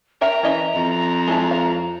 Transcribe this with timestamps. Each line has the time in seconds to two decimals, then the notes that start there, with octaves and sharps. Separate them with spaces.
0.21 A#4 E5 G5 A#5
0.43 E3 C#4 D#5 E5
0.74 F2
1.28 G#3 E4 A5
1.51 F5